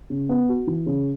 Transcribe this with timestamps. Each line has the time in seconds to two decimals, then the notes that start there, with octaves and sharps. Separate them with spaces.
0.10 C#3
0.29 B3
0.49 F#4
0.67 E3
0.86 C#3